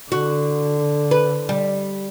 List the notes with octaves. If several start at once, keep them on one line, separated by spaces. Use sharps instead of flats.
D3 F#4
B4
G3